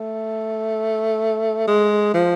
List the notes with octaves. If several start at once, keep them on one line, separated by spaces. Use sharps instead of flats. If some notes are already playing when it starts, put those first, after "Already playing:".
Already playing: A3
G#3
F3